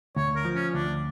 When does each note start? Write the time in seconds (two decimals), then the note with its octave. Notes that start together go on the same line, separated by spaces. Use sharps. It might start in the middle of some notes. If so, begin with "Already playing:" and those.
0.16 D2 C#5
0.36 A#4
0.45 F3
0.55 C#4
0.74 D2 D4